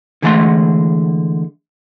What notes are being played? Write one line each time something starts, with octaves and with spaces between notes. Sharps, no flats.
D3 E3 G#3 A3 F#5 C6